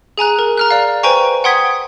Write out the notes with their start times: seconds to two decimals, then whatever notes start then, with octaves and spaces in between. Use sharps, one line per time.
0.18 G#4 G#5 A#5 F#6
0.39 A#4
0.57 A#5 F6 F#6
0.71 D5 F5
1.03 B4 C5 G5 G#5 A#5 C#6
1.44 F#5 G5 C6 D#6 G#6 B6